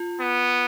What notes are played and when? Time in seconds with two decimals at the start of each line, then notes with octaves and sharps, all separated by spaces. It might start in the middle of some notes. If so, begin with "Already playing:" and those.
Already playing: F4
0.20 B3